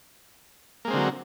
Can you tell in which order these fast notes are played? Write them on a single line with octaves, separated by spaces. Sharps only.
A#3 G#3 C4 D3 F#3